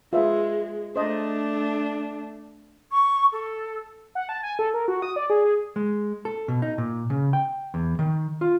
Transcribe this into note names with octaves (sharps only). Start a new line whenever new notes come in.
G#3 F4 B4 E5
A3 D4 C5 D#5
C#6
A4
F#5
A5
G#5
A4
A#4
F#4
D#6
D5
G#4
G#4
G#3
A4
B2
D#4
A#2
C#3
G5
E2
D#3
F4